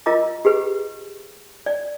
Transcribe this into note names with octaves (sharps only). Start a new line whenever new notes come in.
F4 A#4 D#5 A#5 D6
G4 G#4 B4
D5